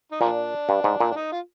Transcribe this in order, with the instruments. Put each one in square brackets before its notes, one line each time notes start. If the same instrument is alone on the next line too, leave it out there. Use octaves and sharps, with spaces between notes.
[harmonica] D#4
[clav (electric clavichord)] A#2 [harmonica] F3 A#3 D4
[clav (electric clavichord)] G2
G#2
A#2
[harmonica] D4
D#4
F4